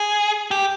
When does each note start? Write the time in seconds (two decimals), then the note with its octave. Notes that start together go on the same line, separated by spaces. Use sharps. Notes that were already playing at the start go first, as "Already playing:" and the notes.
Already playing: G#4
0.51 G4